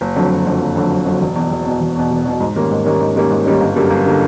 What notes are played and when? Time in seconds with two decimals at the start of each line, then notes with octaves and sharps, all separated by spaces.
0.01 F#1
0.16 F2 D3 F#3
0.31 F#1
0.46 F2 D3 F#3
0.61 F#1
0.76 F2 D3 F#3
0.91 F#1
1.06 F2 D3 F#3
1.21 E1
1.36 E2 B2
1.50 E1
1.65 E2 B2
1.81 E1
1.96 E2 B2
2.11 E1
2.25 E2 B2
2.40 G#2
2.56 D#3 G3 A#3 C#4
2.71 G#2
2.85 D#3 G3 A#3 C#4
3.00 G#2
3.16 D#3 G3 A#3 C#4
3.31 G#2
3.46 D#3 G3 A#3 C#4
3.60 G1
3.76 F#2 D3 G3 A#3
3.90 G1
4.05 D3 G3 A#3